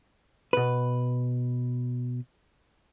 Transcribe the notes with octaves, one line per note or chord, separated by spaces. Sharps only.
B2 B4